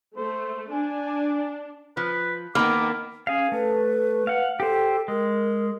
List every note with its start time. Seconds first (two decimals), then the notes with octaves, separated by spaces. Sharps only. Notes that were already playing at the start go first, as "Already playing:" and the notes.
0.17 A3 C5
0.72 D4 G#5
1.97 F3 B4
2.55 D#3 A#3 B3 B5 D6 F6
3.27 C#4 G#4 F5
3.52 A3 B4
4.27 F5 F#5
4.60 G4 A4 C5
5.08 G#3 A#4